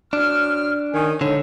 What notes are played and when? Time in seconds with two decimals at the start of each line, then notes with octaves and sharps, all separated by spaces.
0.13 A2 D4 F#4 F6
0.94 D#3 C#5 G#5
1.21 D3 G#3 D4 D#4 C#5